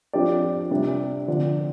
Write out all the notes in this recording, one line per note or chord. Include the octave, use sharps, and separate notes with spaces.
F2 F3 D4 G4 D5
C3 G3 D4
D3 F3 D4